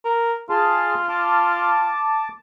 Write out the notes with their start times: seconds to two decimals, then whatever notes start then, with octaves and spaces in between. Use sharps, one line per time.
0.05 A#4
0.50 F4 G#4 A5 C6
1.09 A5 D6